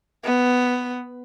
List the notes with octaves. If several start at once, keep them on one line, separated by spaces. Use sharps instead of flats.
B3